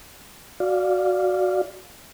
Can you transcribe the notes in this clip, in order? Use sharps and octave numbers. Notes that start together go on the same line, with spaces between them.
F#4 D5 F5